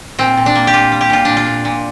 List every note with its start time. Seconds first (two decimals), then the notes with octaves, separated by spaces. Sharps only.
0.19 A#2 C4
0.37 A#2
0.46 D4
0.55 A#3
0.67 G4
0.74 A#2 F4
0.92 G3
1.01 G4
1.10 A#2 F4
1.25 A#2 D4
1.37 F4
1.47 A#2
1.65 A#2